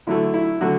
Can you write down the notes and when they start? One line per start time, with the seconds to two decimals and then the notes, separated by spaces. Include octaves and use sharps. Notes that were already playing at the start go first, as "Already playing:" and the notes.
0.07 D3 F#3 A3 E4
0.34 E4
0.61 D3 F#3 A3 F#4